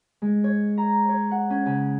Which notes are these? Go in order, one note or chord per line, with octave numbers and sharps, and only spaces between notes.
G#3
C#5
A#5
C#5
F#5
C#4
C#3